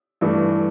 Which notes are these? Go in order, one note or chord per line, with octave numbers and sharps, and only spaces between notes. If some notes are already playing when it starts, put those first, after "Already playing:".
G2 E3 A3